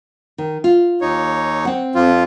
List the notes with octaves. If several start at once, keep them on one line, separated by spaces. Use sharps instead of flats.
D#3
F4
D#2 D#4 C#5
C4 F#5
F2 F3 F4